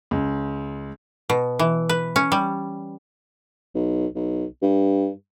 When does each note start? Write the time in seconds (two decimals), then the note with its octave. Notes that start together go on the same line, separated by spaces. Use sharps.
0.11 C#2
1.30 B2
1.59 E3
1.89 B4
2.16 C#4
2.32 G3
3.75 B1
4.15 B1
4.62 G2